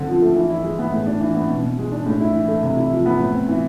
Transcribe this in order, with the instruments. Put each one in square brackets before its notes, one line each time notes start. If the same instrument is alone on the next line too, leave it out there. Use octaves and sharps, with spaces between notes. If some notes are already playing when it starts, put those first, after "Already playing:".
Already playing: [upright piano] D3 C4
F3
A3
E3
E4
G#3
B3
A2
D4
E3
B3
B2
B2
G#3
D4
A2
E4
E3
A3
C3
E4
F3
B3
A2
C4
E3